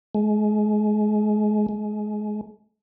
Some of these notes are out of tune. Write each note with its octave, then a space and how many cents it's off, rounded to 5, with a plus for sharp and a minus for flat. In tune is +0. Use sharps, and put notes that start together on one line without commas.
G#3 +30
G#3 +25